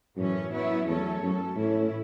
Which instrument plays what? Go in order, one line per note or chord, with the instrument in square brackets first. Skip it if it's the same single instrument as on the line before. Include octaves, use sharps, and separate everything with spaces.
[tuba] F#2 [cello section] A2 E3 C#4
[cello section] F#3 B3 E4 C#5
[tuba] E2 [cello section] F#3 A3 C#4 A4 C#5
[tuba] F#2 [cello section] F#3 C#4 A4
[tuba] A2 [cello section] E3 A3 C#4 E4